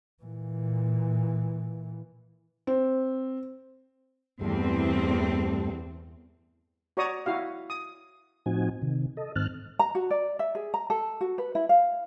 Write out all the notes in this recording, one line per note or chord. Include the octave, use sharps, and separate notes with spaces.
A#2 E3
C4
E2 G2 G3 A3 C4
F#4 C#5 D5 A#5 C#6 D#6
E4 F#4 F5
D#6
A2 F3 C4 D#4 F#4 G#5
C3 D#3
A4 D#5
G#2 D#3 C4 A5 F6 F#6
A#5
F#4
D5
E5
G#4
A#5
A4
F#4
B4
E4
F5